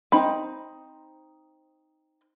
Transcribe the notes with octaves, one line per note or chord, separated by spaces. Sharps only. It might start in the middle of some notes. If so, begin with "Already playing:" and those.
C4 D#4 B5